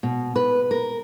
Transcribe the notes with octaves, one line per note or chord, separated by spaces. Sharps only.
B2
B4
A#4